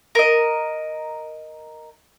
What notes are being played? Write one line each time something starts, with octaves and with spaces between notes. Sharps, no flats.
A#4 D#5